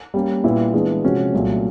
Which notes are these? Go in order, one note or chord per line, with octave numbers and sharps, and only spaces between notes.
G3 A#3 C#4
A#2 G3 B3 E4
E3 G#3 B3 D4
C3 F3 G#3 C#4 F#4
C2 A#2 F#3 A3